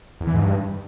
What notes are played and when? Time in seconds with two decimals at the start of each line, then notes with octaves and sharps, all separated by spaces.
0.21 E2
0.27 E3
0.34 G#2
0.41 G2